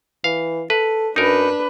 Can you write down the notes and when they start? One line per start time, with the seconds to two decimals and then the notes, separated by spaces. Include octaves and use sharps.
0.24 E3 F5
0.70 A4 B4
1.16 F#2 D4 D#4 A#4 B4